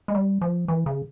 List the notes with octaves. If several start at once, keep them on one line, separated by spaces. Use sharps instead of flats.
G#3
G3
F3
E3
C#3